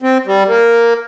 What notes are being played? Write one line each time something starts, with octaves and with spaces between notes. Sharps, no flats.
C4
G3
A#3